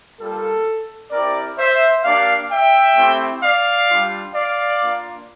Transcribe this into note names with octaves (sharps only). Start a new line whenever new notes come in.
G3 A#3 F4 A4
C4 E4 G4 A#4 D5
C5 E5
A#3 D4 G4 D5 F5
E5 G5
A3 C4 E4 G4
D5 F5
G3 D4 F4
D5 F5
A#3 D4 F4